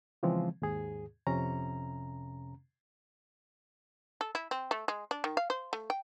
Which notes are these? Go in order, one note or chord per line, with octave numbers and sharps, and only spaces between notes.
C#3 E3 F3 G#3 C4
D#2 G#2 G#4
F2 C3 C#4 A#5
A4
E4
C4
A3
G#3
D4
D#3
F5
C5
A3
G5